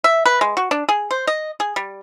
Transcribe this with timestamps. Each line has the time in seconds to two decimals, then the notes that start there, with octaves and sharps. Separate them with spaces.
0.04 E5
0.26 B4
0.41 G#3
0.57 F#4
0.71 D4
0.89 G#4
1.11 C5
1.27 D#5
1.60 G#4
1.76 G3